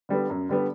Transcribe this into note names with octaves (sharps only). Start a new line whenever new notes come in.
D3 G3 B3
F#2
D3 G3 B3